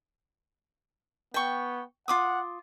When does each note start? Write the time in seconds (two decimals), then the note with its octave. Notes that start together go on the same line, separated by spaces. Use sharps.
1.34 B3 G5 C#6
2.08 F4 F#5 D6 D#6